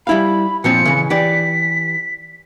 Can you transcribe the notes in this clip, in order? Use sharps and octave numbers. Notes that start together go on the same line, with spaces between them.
G3 E4 F5 B5
A#2 F3 C4 C#7
C#3 E3
E3 G4 D5 B6